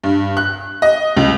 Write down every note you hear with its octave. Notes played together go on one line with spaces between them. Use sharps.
G2
F#6
D#5
C#2